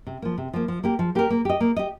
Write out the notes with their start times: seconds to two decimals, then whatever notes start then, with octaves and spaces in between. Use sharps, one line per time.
0.07 C3
0.22 F3 A#3
0.38 C3
0.54 F3 A#3
0.68 F3
0.83 A#3 G4 A#4
0.99 F3
1.15 A#3 G4 A#4
1.30 A#3
1.45 G4 D#5
1.60 A#3
1.76 G4 D#5